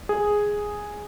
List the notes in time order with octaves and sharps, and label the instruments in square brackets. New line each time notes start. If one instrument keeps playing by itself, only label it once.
[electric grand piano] G#4